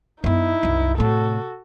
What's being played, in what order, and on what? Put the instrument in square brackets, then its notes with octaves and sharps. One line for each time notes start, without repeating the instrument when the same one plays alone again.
[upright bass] F#2 B3 [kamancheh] D#4 E4
[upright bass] C2 F#2
[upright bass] A2 C3 [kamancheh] F#4 A4